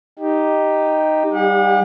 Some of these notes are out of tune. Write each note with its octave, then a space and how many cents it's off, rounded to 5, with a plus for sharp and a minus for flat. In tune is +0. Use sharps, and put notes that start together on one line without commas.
D#4 +0 G4 +5
G3 +0 G4 +35 F#5 -40